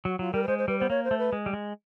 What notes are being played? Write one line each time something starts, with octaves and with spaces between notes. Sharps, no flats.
F#3 F#4
F#3 F4
G3 A#4
B4
G#3 C5
C5
G3 B4
B3 C5
A#3 C#5
C5
A3
B4
G#3
G3
G#3